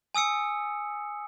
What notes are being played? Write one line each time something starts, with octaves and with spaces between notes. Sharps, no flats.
G#5 D#6 E6 C#7